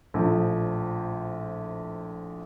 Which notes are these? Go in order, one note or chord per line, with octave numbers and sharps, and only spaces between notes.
A#1 A2 F3